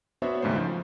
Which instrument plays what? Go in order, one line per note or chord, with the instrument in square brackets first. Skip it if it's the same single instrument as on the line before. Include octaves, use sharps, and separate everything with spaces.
[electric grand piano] B3 D4 F#4 C5 C#5 E5
D#2 G#2 C#3 A3 C5
F3